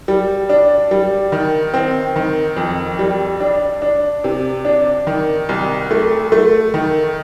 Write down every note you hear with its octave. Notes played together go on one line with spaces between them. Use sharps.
G3
D4
G3
D#3
C4
D#3
F2
G3
D4
D4
C3
D4
D#3
C2
A3
A3
D#3